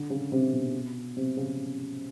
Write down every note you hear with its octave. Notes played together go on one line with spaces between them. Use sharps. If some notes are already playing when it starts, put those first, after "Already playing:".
Already playing: D3
C#3
C3
B2
C3
C#3